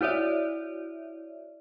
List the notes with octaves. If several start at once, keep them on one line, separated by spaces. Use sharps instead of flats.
E4 F#4 C#5 D5 E5